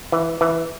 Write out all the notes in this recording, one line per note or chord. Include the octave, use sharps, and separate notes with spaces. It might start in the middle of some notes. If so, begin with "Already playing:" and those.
E3
E3